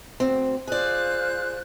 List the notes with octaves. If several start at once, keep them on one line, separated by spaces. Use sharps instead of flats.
D2 C4
F4 G#4 C5 D5 F#6